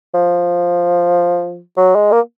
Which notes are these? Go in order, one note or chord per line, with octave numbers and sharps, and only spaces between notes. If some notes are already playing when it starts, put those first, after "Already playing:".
F3
F#3
G#3
A#3